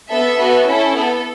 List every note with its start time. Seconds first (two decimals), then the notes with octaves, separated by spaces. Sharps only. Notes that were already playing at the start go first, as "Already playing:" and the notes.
0.09 B3 A4 E5
0.37 B3 F#4 A4
0.65 C#4 E4 A4
0.93 B3 A4